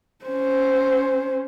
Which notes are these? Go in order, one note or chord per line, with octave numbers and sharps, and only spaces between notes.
C#4 C5